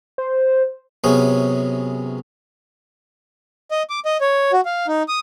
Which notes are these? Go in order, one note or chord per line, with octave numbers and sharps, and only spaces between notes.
C5
F#2 C3 B3 C#4 G#4
D#5
D6
D#5
C#5
F#4
F5
D#4
D#6